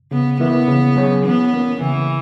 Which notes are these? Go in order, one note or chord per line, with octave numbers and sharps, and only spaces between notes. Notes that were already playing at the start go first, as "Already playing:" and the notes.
C#3 B3
E3 A#3 B3 E4 B4
C#3
F#3 C#4 G#4 C#5
E3 B3
A#3 C#4
C#3 E3